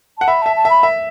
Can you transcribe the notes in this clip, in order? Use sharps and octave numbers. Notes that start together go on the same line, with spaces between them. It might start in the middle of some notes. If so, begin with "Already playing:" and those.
F#5 A5
E5 B5
E5 A5
A5
E5 B5
E5